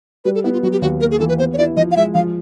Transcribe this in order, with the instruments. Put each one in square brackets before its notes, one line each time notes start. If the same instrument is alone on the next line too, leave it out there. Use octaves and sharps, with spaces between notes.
[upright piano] G3 [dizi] B4
[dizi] A4
[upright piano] B3 [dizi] E4
[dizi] F4
[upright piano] F#3 [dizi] F#4
[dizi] G4
[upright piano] D#2 [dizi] F#4
[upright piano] A#3 [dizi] A#4
[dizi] G#4
[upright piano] E3 [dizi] A4
[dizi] B4
[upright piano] B3 [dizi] C5
[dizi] C#5
[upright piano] E4 [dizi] D5
[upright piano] F3 [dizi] D#5
[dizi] F5
[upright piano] G#3 [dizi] E5
[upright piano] F3 [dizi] F5